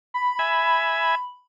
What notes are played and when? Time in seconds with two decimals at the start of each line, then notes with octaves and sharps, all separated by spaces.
0.14 B5
0.39 E5 G#5